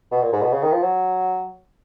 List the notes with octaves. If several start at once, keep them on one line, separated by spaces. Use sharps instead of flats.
B2
A#2
G#2
B2
C#3
D#3
F3
F#3